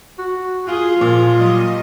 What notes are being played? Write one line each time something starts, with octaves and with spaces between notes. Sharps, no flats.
F#4
F4 G#4
A#2 F3
F#3 G3 D#5